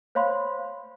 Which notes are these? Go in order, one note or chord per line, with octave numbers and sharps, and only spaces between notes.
C5 C#5 F5 B5 C6